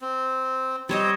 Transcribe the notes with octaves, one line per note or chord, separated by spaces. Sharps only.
C4
G3 C4 C5 C#5 D#5